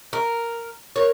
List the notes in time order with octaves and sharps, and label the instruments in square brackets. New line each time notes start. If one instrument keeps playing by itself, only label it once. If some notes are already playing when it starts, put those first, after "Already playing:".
[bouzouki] A#4
[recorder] A#4 [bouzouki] C#5